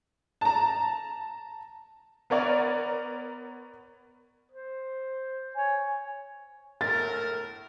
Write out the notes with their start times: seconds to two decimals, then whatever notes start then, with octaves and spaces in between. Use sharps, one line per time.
0.41 A5 A#5
2.30 B3 A#4 C#5 D5
4.52 C5
5.56 C#5 G#5
6.81 A2 A#4 A6